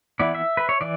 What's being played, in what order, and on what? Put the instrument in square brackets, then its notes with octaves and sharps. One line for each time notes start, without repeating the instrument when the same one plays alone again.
[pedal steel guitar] E3 B3 E4 D5
E5
B4
C#5
E3 D5